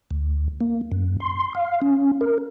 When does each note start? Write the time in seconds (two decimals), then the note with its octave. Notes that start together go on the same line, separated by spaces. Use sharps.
0.11 D2
0.60 A#3
0.91 F#2
1.20 C6
1.55 F5
1.82 C#4
2.21 A#4